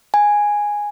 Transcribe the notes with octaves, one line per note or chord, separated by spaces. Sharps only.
G#5